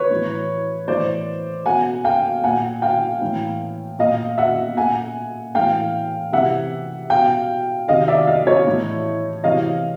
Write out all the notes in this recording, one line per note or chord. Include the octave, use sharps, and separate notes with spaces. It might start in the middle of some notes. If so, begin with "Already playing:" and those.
Already playing: B4 C#5
A2 E3
A2 E3 C5 D5
B2 F#5 G#5
F5 G5
A#2 F#5 G#5
F5 G5
A2 E3
A#2 D#5 F5
E5 F#5
A#2 F#5 G#5
A2 E3 F5 G5
C3 E3 E5 F#5
B2 F5 G5
C3 D#3 D#5 F5
D5 E5
D#5 F5
C#5 D#5
A2 E3
C3 E3 D#5 F5